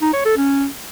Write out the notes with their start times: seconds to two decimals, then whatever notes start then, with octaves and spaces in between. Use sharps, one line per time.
0.02 D#4
0.13 C#5
0.25 A4
0.37 C#4